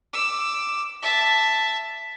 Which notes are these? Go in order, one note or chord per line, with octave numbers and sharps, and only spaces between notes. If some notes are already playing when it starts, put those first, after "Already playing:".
D6 E6
E5 A5